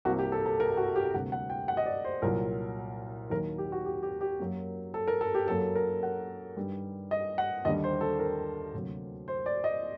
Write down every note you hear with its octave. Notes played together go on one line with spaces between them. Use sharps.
C2 C3 G3 A#3 F#4
G4
A4
A4
A#4
F#4
G4
D2 C3 G3 A#3 F#5
F#5
G5
F#5
D#5
D5
C5
C2 A#2 F#3 A#4
D#2 D#3 F#3 A#3 A#4
G4
F#4
G4
G4
G4
F#2 F#3 A#3
A4
A#4
A4
G4
F#2 F#3 A#3 A4
A#4
F#5
G2 D#3 G3
D#5
F#5
D#2 D3 G3 D#5
C5
A4
A#4
D2 C3 F#3 A#3
C5
D5
D#5